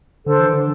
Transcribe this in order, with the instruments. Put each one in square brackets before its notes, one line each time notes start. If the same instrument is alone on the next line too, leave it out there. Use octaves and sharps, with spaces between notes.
[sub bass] D3 [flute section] D4 A4 C5
[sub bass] E3
D3